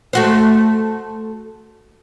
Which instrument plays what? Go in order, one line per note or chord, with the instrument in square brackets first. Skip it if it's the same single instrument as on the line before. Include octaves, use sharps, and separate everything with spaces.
[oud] A3 F#4 C5